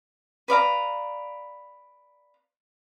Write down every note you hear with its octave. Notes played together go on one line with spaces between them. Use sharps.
B4 D5 F5 A#5